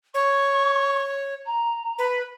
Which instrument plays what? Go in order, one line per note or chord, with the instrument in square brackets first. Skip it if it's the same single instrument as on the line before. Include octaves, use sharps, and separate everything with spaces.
[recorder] C#5 [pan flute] C#6
[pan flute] A#5
[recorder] B4